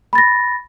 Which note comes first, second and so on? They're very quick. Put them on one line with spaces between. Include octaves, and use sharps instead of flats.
B5 A6 A#6